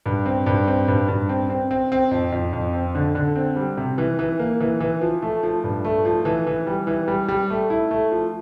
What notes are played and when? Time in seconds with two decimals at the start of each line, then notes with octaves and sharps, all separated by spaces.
0.06 G2
0.26 C4
0.46 G2
0.68 C4
0.88 G2
1.08 G2
1.29 C4
1.50 C4
1.71 C4
1.92 C4
2.11 F2
2.32 F2
2.53 F2
2.73 C4
2.95 D3
3.15 D3
3.36 C4
3.56 G3
3.77 C3
3.98 E3
4.19 E3
4.39 A#3
4.60 E3
4.80 E3
5.01 F3
5.22 A3
5.43 F3
5.64 G2
5.85 A3
6.05 F3
6.25 E3
6.47 E3
6.67 G3
6.87 E3
7.08 G3
7.28 G3
7.50 A3
7.70 E4
7.91 A3
8.12 F3